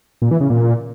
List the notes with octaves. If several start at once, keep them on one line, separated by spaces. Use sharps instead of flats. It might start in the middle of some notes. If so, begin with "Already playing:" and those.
A#2
E3
C#3
A#2